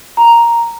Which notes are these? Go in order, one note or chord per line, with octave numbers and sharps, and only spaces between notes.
A#5